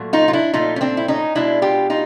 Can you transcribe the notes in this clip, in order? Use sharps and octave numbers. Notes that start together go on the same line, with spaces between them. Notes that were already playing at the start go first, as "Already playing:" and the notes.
Already playing: A#2 F#3 A3
D#4 F4
F4
D4 E4
A#2 F3 A3 D#4 F4
C#4
C4 D4
E4
C#4 D#4
B2 G#3 D4 E4
F4 G4
D#4 F4